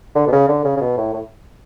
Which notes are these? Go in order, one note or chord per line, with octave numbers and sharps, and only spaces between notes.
D3
B2
C#3
D3
C#3
C#3
B2
A2
A2